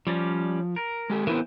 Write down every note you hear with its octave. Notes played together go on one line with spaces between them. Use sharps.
F3 G3 C#4 D5
A#4
G#3 G4 A4
E3 B3 C4 E4 A#4